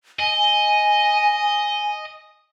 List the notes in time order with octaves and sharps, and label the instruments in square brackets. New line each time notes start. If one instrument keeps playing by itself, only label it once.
[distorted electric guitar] D#5 [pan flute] G#5